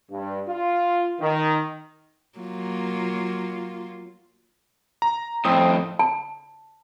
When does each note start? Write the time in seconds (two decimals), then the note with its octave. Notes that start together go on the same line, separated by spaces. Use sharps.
0.11 G2
0.47 F4
1.20 D#3
2.38 F#3 A#3 F4
5.02 A#5
5.45 F2 A2 C4 D#6
5.99 A5